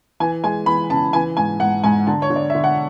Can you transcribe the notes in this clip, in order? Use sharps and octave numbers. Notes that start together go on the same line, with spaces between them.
E3 G#5
G#3 G#5
E3 B5
C#3 A5
E3 G#5
G#2 G#5
G#2 F#5
G#2 G#5
D3 A5
C#5
D3
D5
D3 E5
F#5